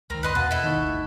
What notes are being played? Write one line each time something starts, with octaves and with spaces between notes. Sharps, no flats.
C#2 D#3 C4 A#4
F#2 B4 D#5 C6
E2 B2 B3 F5 F#5 A5 F#6
E4 A4 D#5 F#6
D#3 A#3 D#4 D#5 C#6
G1 D2